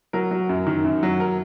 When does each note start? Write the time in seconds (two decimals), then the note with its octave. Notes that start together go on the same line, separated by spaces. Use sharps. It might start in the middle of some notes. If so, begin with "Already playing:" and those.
0.13 F#3 A#4
0.31 F#3
0.49 F#2
0.67 D#3
0.84 F#2
1.03 F#3
1.20 A#4